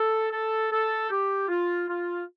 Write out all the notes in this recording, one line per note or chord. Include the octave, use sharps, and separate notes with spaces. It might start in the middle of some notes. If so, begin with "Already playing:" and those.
Already playing: A4
A4
A4
G4
F4
F4